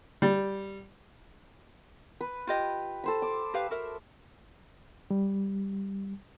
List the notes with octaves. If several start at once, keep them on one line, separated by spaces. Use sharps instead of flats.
G3
B4
F4 G4 D#5
A4 C5 B5
D6
G4 B4 F5
F#4 A#4 E5
G3